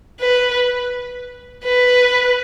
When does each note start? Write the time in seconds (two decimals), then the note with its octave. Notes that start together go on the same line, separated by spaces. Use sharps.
0.21 B4
1.64 B4